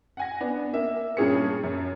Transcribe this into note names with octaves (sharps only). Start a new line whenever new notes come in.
F#5 G#5 A#6
B3 D4
A#3 E5
G2 A#2 C#4 G#4 C#5 C#7
F#2